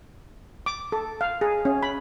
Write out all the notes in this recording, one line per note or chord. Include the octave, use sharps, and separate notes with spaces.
D6
A4
F5
G#4
C#4
B5